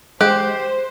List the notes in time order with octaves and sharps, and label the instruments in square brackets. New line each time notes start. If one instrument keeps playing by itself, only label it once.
[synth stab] G#3 [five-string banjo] G4 [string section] C5 [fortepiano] F#6